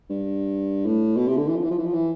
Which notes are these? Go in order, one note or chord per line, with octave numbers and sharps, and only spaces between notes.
G2
A2
B2
C3
D3
E3
F3
E3
F3
E3
F3
E3